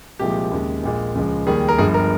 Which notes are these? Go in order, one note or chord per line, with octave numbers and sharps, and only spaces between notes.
C2 A#2 F3 G#3 G4
D#2 C#3 G#3
A#1 A#2 G#3
C#2 C#3 F3 G#3
D#2 D#3 G3 G#4
A#4
G1 G2 F3 G#3 G#4
A#4